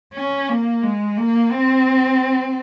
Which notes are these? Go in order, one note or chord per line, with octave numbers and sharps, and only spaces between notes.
C#4
A#3
G#3
A#3
C4